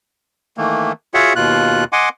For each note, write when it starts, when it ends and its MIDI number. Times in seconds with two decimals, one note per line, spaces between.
0.57 0.92 51
0.57 0.92 52
0.57 0.92 57
0.57 0.92 58
1.14 1.33 65
1.14 1.33 66
1.14 1.33 68
1.14 1.33 73
1.14 1.33 76
1.14 1.33 78
1.36 1.84 39
1.36 1.84 47
1.36 1.84 65
1.36 1.84 90
1.93 2.09 75
1.93 2.09 78
1.93 2.09 80
1.93 2.09 84
1.93 2.09 86